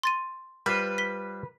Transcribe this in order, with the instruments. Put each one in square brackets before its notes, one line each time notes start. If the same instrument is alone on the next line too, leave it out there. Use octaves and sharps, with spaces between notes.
[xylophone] C6 A6 D#7
[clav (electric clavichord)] G3 F4 C5 [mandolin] B4
[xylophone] B6 G7